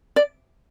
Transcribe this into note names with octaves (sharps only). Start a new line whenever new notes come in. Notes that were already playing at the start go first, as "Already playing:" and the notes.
D5